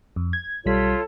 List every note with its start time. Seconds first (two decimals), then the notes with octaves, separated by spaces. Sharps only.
0.16 F2
0.33 G#6
0.66 B1 G3 F4 A4 C#5 B6